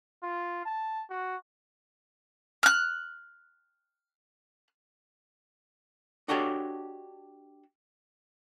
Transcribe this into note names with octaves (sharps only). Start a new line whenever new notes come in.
F4
A5
F#4
F6 F#6
D4 F#4 G4 A4 C#5 D#5